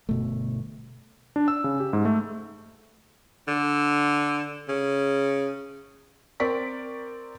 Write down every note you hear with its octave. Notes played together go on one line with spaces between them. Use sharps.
G1 B2 A3
D4
E6
C#3
G4
G#2
A3
D3
C#3
C4 A#4 D5 C#6 B6